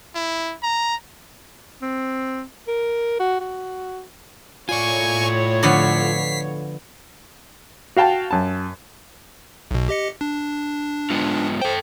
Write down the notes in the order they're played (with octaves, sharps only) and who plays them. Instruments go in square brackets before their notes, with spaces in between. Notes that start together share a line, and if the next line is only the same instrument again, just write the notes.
[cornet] E4
A#5
[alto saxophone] C4
A#4
F#4
F#4
[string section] A2 C#5 [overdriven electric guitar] F4 D5 [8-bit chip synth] G#5 C#6
[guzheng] D3 F3 B3 [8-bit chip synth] B6 C7
[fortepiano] F#4 F5 G5 A5
F#2 A5
[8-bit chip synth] B1 B2
G4 D#5 C#7
D4
[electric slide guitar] G#3 B3 F4
[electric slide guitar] A4 G5 [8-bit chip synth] C5